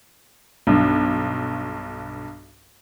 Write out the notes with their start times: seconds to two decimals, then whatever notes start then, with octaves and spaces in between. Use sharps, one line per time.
0.67 B1 G2